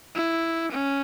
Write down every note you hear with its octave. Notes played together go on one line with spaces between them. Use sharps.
E4
C#4